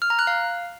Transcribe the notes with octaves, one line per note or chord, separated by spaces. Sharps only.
F6
A#5
F#6
F5